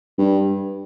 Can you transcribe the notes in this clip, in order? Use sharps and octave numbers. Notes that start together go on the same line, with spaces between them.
G2